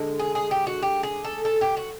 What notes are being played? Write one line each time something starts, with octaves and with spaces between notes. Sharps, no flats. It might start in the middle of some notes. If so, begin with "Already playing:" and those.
Already playing: D3 G#3
G#4
G#4
G4
F#4
G4
G#4
A4
A4
G4
F#4